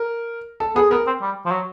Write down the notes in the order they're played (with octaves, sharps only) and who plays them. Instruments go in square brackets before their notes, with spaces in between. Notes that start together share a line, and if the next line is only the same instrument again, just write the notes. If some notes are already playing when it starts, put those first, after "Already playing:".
Already playing: [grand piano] A#4
A4
[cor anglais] B3 [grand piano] G#4
[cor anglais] B3 [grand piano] A#4
[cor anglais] C4
G3
F3
F#3